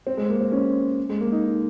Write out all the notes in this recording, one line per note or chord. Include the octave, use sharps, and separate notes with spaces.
C4
G#3
A#3
C4
C#4
G#3
A#3
D#4